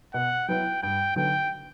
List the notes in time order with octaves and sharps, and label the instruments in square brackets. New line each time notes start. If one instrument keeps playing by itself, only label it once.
[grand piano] B2 [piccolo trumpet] F#5
[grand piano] F#3 B3 E4 [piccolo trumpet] G5
[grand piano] G2 [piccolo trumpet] G5
[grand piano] D3 F#3 B3 D#4 [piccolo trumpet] G5